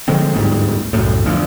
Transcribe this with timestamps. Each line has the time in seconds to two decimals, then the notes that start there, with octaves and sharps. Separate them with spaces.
0.08 D3 F3 G#3 C4
0.34 G1 D2 G#2 G3
0.93 C2 F#2 A2
1.26 D2 F3